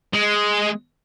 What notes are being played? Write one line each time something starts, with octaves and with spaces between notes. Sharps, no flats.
G#3